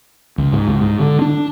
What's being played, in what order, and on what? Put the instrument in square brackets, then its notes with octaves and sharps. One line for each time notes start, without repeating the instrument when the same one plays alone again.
[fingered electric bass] C#2
G#2
C#2
G#2
D3
D4